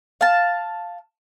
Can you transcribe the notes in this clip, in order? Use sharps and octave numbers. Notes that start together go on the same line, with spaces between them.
F5 A5